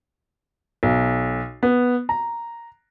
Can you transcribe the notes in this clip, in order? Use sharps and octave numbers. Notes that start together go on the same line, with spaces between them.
B1
B3
A#5